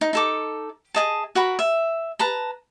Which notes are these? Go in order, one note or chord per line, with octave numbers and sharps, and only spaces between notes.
D#4
D#4 A4 D6
G#4 D#5 A5
F#4 A#4 B5
E5
B4 A5 A#5